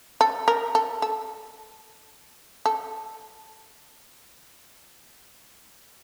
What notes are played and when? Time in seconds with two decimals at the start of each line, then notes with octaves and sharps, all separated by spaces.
0.21 A4
0.48 A#4
0.75 A4
1.02 A4
2.66 A4